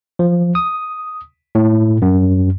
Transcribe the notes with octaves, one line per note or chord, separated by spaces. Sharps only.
F3
D#6
A2
F#2